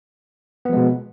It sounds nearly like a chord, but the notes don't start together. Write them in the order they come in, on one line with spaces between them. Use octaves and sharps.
B3 F3 G#3 B2